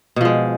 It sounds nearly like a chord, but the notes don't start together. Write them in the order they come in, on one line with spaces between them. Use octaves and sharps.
B2 F3 G#3